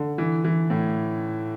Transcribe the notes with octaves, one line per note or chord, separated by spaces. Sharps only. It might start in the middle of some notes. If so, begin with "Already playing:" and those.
Already playing: D3
E3
E3
A2